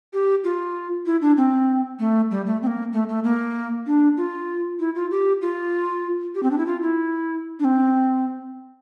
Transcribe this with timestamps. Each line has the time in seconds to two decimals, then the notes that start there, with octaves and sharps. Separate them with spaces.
0.13 G4
0.44 F4
1.06 E4
1.21 D4
1.37 C4
1.99 A3
2.31 G3
2.46 A3
2.62 C4
2.67 A#3
2.93 A3
3.09 A3
3.24 A#3
3.87 D4
4.17 F4
4.79 E4
4.95 F4
5.11 G4
5.41 F4
6.35 G4
6.43 C4
6.51 D4
6.58 E4
6.66 F4
6.82 E4
7.60 D4
7.64 C4